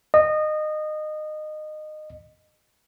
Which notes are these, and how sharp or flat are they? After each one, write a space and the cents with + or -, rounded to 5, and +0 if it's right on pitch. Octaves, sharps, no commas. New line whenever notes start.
D#5 -20